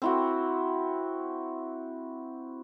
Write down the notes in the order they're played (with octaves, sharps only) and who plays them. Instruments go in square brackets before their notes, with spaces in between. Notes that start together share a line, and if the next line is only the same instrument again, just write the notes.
[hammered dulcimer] C4 E4 F#4